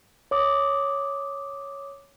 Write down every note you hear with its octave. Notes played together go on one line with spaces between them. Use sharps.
C#5 D6 D#6